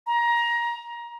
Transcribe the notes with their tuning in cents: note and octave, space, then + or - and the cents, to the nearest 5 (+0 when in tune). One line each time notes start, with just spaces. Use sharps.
A#5 +20